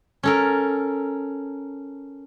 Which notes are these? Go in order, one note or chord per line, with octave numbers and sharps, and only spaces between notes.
C#4 A4 A#4